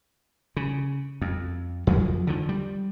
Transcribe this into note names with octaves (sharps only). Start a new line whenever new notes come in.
C#3
F2
F2 F3 F#3
D3 D#3 F3
G3